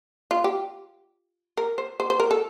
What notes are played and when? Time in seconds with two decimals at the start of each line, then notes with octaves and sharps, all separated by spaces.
0.31 F4
0.44 G4
1.57 A#4
1.78 C5
2.00 C5
2.10 C5
2.20 A#4
2.31 A4